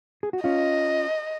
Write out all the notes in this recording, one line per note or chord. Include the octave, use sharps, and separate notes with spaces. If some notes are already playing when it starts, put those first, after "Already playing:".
G#4
F#4
C#4 F4 D#5